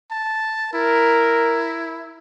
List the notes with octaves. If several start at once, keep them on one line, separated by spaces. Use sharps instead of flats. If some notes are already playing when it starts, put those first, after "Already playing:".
A5
E4 A#4